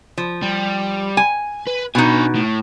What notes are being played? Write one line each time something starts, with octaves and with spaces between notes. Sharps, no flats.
F3
G3
G#5
B4
B2 D4 D#4 G#5
A2